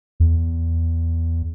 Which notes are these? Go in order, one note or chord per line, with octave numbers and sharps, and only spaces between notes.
E2